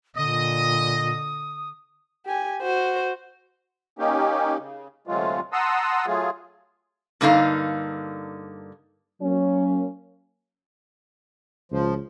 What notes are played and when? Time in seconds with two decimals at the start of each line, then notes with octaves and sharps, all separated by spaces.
0.16 A#2 D3 D#5 D#6
2.26 G4 G#5
2.62 F#4 C5
3.99 A#3 C#4 D#4 G4
4.58 C#3
5.07 D2 C3 F#3 G#3 A3 F4
5.53 F#5 A5 A#5 C6 D#6 E6
6.06 F#3 A3 F4 G#4
7.21 G2 D3 A#3 D#4 F5
9.22 F#3 A#3 C#4
11.72 C#2 F3